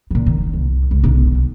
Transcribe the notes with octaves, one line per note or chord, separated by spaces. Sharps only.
A#2 E3
D#3
C2
C#2
B1 D3